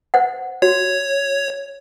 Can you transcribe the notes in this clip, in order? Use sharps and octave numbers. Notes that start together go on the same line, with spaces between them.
C5 F#5
F#4 C#5